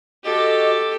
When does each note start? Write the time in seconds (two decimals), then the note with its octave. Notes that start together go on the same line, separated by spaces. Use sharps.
0.24 F#4 G4 A4 D#5 D6